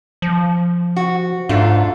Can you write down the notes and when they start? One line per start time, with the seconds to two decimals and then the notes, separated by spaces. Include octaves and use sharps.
0.22 F3
0.96 F#4
1.49 G#2 A3 D4 F4